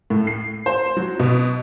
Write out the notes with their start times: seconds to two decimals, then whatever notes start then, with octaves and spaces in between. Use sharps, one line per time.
0.10 A2
0.27 C7
0.66 C5
0.97 F#3
1.19 B2